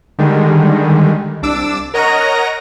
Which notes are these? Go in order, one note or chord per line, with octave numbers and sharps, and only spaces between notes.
D3 D#3 G3 G#3
C2 D4 D6 E6
A#4 C#5 D#5 F#5 A#5 A#6